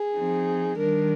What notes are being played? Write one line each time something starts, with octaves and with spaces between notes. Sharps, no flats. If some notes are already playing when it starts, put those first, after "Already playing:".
Already playing: G#4
F3 C4 D#4
D#3 G3 D4 A#4